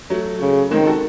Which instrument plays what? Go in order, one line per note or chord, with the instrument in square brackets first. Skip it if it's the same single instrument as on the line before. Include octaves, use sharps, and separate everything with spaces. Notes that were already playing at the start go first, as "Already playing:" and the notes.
[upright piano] F#3 A3
[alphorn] C#3
[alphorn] D#3 [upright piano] G#3 C4
[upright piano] F#4 A4